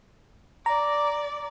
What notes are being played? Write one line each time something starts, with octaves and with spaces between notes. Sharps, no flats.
D5 A#5